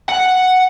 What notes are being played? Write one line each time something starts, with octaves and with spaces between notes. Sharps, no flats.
F#5